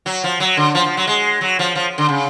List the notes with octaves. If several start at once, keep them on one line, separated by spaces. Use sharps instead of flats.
F#3
F3
F#3
D3
F3
F3
F#3
G#3
F#3
F3
F3
D3
C#3